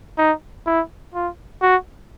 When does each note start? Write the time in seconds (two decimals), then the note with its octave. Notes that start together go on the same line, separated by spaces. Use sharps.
0.18 D#4
0.67 E4
1.14 F4
1.62 F#4